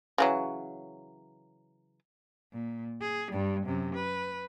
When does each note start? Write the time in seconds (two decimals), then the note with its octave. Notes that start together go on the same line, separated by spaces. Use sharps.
0.18 C#3 E3 F#3
2.53 A#2
3.01 G#4
3.32 G2 G3
3.65 F#2 C3
3.95 B4